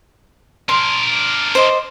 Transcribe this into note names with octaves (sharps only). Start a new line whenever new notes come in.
D4 A#4 C6
C5 D5 D#5